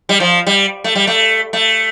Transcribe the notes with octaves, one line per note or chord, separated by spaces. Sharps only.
G3
F3
G3
A3
G3
A3
A3